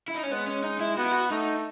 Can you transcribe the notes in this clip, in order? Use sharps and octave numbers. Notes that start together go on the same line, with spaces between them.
E4
D#4
C#4
G#3 B3
C#4
D#4
E4
B3 F#4
E4
F#4
A3 D#4